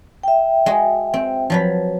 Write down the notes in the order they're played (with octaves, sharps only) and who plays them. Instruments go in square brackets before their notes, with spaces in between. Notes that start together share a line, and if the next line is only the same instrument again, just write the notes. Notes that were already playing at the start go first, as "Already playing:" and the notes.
[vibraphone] E5 G5
[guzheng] G#3 F#4
C4
F3 F#3 B4